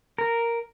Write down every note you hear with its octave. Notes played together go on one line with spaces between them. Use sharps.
A#4